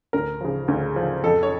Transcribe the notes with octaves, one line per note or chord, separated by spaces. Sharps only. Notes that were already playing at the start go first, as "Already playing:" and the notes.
D2 A#4
C#3 F3
D2
C#3 F3
F2 A4
C#5